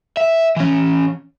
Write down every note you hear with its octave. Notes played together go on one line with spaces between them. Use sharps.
E5
E3 C#4